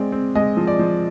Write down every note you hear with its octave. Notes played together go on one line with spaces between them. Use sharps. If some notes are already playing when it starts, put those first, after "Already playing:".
Already playing: G#3 C4 D5
C4
G#3 D#5
F3
D5
F3